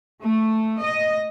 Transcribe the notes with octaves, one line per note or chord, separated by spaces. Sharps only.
A3
D#5